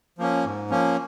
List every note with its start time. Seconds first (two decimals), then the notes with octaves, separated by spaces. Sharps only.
0.18 F3 A#3 C#4
0.45 G#2
0.70 F3 A#3 C#4